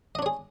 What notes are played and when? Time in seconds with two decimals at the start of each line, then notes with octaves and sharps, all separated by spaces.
0.15 D#5
0.19 D4
0.22 C#5
0.26 G#4